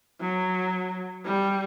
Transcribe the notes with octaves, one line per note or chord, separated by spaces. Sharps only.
F#3
G3